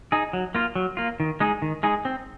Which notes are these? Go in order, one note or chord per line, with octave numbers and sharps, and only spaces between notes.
D#4 G#4
F#3
A#3 F4
F#3
A#3 F4
D#3
G#3 D#4 G#4
D#3
G#3 D#4 G#4
C4